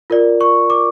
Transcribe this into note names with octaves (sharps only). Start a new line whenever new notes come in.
F4 A#4 D5
C#6
D6